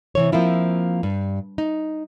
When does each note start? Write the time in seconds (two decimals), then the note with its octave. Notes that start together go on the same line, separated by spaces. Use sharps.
0.15 C3 E3 C#5
0.32 F3 A#3 C4 E4 F4
1.03 G2
1.58 D#4